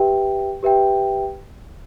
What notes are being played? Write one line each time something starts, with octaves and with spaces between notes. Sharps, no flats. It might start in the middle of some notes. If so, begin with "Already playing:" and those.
Already playing: G4 B4 E5 G5
G4 B4 E5 G5